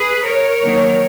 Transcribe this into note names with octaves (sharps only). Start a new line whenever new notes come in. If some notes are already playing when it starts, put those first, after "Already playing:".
Already playing: G#4 B4
A#4 C#5
D#3 F#3 A#3